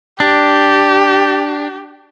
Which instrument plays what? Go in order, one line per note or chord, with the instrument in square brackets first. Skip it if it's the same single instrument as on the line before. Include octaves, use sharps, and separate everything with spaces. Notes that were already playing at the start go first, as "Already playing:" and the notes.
[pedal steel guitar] D4 [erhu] G4